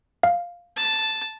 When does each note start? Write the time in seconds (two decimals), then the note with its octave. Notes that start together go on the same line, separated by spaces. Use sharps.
0.23 F5
0.76 A5